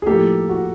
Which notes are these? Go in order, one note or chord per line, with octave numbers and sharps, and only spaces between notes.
G#4
A2 F3 A#3 G4 A4
F#4